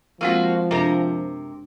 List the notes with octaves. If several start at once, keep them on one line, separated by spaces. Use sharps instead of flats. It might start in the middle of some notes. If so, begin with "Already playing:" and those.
F3 G#3 A#3 C4 F4 F#4 E6
F#2 C3 D4 A#4